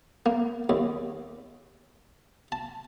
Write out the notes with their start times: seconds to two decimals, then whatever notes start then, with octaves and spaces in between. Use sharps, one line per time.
0.26 A#3
0.69 D#2
2.52 A5